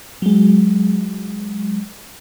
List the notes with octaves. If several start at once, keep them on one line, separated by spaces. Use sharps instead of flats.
F#3 G#3